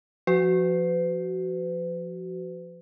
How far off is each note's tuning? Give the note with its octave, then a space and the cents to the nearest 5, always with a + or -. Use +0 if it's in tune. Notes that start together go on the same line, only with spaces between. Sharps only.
F3 +0 F#4 +15 B4 +40